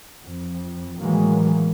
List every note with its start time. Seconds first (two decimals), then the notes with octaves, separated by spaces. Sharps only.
0.21 F2
0.99 A2 D#3 E3 F#3 G#3 A#3